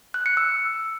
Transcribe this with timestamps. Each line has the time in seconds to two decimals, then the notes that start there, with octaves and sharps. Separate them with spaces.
0.14 F#6
0.26 C#7
0.37 E6